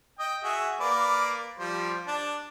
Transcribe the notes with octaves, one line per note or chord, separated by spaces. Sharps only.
D#5 G5
F#4 G#4 E5
A#3 B4 D5
F3 G3 C5
D4 A5